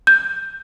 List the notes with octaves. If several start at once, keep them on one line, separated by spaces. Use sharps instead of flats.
G6